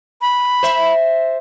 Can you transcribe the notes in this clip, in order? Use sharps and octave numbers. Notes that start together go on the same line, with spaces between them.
B5
C5 E5